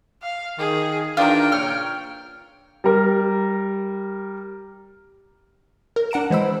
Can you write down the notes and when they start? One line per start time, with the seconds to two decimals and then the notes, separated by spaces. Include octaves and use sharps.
0.22 F5
0.58 D#3 G#4
1.17 D#3 E3 D4 F4 A#4 G5
1.52 A#2 C#3 C#5 F6
2.84 G3 A#4
5.96 A#4
6.11 D4 F#5 A#5 D7 E7
6.30 E3 G#3 C5 B5 E6